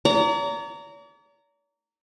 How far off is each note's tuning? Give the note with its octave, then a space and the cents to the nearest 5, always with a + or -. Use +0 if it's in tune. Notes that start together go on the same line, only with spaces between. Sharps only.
D5 -45 A#5 -15